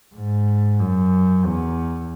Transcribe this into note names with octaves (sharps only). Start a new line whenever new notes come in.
G#2
F#2
E2